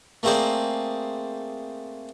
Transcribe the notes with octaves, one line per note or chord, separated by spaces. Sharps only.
A3 A#3 C4 G#4 C5 D5